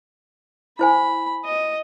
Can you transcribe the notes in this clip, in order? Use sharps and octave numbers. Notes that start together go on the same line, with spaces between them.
E4 C5 G#5 B5
D#5